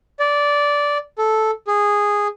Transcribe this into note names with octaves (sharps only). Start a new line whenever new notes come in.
D5
A4
G#4